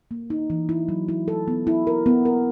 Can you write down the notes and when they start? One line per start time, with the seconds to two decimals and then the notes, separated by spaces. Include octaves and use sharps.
0.11 A#3
0.30 D#4
0.50 E3
0.69 E4
0.89 F#3
1.08 E4
1.28 A4
1.48 B3
1.67 E4
1.87 A#4
2.06 B3
2.25 A#4